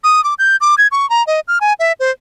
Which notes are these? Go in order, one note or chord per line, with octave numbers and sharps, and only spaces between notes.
D#6
D6
G6
D6
G#6
C#6
A#5
D#5
F6
G#5
E5
C5